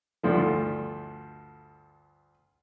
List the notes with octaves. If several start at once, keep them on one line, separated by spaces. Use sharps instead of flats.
D2 G2 F3 A3